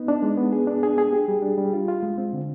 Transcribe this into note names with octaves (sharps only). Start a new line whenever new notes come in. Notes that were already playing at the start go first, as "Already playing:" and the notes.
Already playing: B3 D#4
D4
G#3
B3
G#4
D4
G#4
G#4
G4
G3
D4
G3
F4
F4
G#3
C4
D3